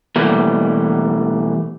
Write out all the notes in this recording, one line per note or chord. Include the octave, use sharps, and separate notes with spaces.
B2 E3 G3 A3 A#3